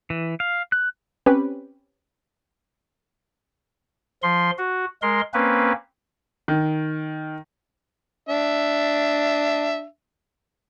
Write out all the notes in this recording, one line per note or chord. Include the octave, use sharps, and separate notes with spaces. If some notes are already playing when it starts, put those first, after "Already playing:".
E3
F5
F#6
C4 C#4 G4 B4
F3 C6
F#4
G#3 A#4 C6
A#3 C4 C#4 B4
D#3
D4 E5